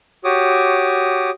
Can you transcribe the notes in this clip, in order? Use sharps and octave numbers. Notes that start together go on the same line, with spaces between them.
F#4 G4 C#5 D6 D#6